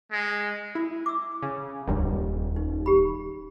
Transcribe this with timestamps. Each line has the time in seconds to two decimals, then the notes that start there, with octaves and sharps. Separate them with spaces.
0.11 G#3
0.75 E4
1.06 D6 E6
1.43 C#3
1.87 D#1 C#2 G2 D#3
2.56 D#4
2.86 G4 B5